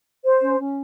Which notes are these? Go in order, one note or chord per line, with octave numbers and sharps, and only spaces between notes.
C5
C#4
C#4